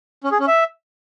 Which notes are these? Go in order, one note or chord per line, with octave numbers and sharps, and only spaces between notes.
C#4
G#4
C#4
E5